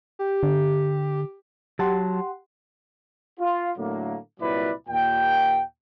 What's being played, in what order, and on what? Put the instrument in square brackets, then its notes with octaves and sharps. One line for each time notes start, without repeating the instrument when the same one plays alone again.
[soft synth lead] G4
[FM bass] D3
[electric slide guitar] F#3 A5 [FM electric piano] G4 F#5 C6
[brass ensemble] F4
A2 D3 F#3 A3 A#3
C2 A#2 F#3 E4 B4 D5
D#2 A#2 G5